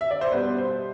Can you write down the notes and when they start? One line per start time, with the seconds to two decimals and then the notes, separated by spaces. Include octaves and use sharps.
0.01 E5
0.11 D5
0.21 C5
0.32 B2 G3 B3 B4
0.59 C5